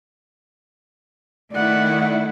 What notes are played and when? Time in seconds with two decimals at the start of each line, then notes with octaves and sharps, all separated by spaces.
1.52 D#3 A3 E4 D5 F#5